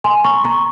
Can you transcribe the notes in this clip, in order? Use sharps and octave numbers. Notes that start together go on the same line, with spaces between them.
G#5 C6
A#5 C#6
A#5 C#6